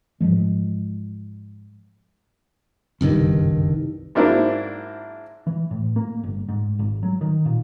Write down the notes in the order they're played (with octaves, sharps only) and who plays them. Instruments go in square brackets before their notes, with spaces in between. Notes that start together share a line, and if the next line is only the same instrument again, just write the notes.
[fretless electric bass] G#2 E3 F3 G#3
[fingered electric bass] F#1 C2 G2 D#3
[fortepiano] G#2 F#3 A#3 C4 D4 E4
[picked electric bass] E3
A2
A#3
G1
G#2
G#1
F#3
D#3
A#2